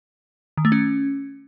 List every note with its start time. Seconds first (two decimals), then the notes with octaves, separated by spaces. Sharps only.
0.57 D#3
0.65 A3
0.72 C#4